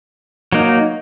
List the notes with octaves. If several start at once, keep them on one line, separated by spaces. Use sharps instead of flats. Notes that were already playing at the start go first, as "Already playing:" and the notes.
F#3 A#3 D#4